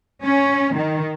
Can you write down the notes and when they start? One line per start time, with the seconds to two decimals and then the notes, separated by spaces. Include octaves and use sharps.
0.24 C#4
0.76 D#3